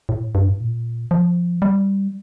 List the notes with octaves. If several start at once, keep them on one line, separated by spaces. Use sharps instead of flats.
A2
G2
A2
A#2
F3
G3